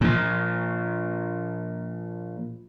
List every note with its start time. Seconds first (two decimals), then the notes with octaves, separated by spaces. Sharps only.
0.01 A#2 F3